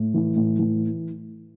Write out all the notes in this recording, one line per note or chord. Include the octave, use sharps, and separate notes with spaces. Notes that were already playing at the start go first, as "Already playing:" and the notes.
Already playing: A2
E3
A2
E3